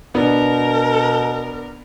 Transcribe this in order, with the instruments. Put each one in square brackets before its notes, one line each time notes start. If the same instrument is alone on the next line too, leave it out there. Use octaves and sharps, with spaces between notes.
[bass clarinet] B2 [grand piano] B3 D4 [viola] A#4